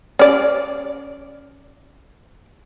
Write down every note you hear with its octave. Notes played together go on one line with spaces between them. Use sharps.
C#4 D5